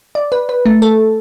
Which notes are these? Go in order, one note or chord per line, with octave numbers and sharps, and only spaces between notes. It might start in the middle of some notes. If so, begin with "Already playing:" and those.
D5
B4
B4
A3
A4